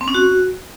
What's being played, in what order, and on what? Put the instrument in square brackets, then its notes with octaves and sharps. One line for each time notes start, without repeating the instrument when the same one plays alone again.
[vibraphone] C4
C#4
F#4